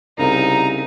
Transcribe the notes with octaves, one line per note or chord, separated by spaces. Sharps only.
C2 C#3 C4 D#4 A#5